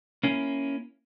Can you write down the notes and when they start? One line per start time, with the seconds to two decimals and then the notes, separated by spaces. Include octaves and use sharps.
0.23 A#3 C#4 E4